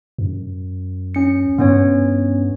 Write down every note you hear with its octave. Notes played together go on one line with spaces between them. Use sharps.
F#2
C#4 C#7
G2 B3 C#4 C#5